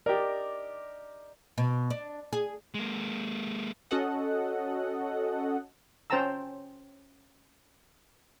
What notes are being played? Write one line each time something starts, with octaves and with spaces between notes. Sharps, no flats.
G4 A#4 D5 D#5
B2
D4
G#4
G#3 A#3
C#4 F#4 A4 D#5 F#5
C#4 C5 G5 A5 A#5 E6